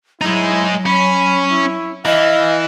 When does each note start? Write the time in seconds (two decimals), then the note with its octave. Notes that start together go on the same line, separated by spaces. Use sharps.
0.22 F#3 G#3 D#4 E4
0.86 C#4 B5
1.50 E4
2.05 E3 D#5 F5